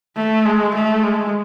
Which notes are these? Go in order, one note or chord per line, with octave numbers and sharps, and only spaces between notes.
A3
G#3
A3
G#3